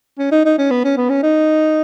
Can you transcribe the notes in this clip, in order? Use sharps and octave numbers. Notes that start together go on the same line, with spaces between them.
C#4
D#4
D#4
C#4
B3
C#4
B3
C#4
D#4